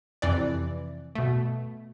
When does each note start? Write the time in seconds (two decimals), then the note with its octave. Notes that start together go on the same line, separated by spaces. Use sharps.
0.22 F2 C3 E3 D5
1.15 B2 A3